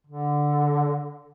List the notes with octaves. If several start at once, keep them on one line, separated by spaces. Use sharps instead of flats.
D3